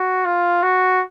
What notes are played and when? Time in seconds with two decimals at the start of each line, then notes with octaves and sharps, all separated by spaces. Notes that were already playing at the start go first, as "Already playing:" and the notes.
Already playing: F#4
0.25 F4
0.63 F#4